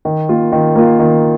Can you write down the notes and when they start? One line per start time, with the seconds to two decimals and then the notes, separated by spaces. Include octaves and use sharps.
0.05 D#3
0.29 A#3 F4
0.52 D#3
0.76 A#3 F4
0.99 D#3